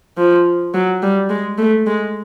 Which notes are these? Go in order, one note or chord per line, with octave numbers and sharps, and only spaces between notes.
F3
F#3
G3
G#3
A3
G#3